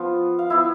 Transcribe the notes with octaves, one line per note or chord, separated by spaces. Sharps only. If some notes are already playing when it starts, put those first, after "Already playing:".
Already playing: F3 B3 F4
F5
B3 E4 E5